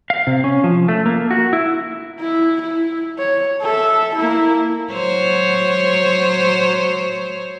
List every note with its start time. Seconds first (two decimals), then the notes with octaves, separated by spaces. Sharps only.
0.10 F5
0.27 C3
0.44 C#4
0.64 F3
0.88 A3
1.06 A#3
1.31 F#4
1.53 E4
2.19 E4
2.62 E4
3.18 C#5
3.61 A4 E5
4.15 A#3 E4
4.92 F#3 C5 C#5